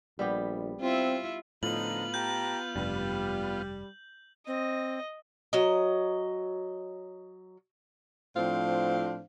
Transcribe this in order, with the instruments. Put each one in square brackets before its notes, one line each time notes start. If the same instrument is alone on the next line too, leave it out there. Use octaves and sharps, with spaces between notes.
[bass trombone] A#1 [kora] G3 B3 G4
[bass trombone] C4 [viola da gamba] E4 F4
[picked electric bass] A2 [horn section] D3 F3 D#4 [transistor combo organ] B3 F4 [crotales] F#7
[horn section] G4 A5 A#5 [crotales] G6
[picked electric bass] F1 G2 [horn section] G3
[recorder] C4 [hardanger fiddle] D#5
[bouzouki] F#3 D#5
[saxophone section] A2 F3 C4 D4 C5 F5